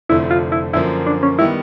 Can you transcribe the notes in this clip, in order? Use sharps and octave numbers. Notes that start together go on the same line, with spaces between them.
F1 F2 D3 F3 A3 E4
F4
E4
F#2 D3 F3 A#3 E4
D4
C#4
D#3 G3 B3 E4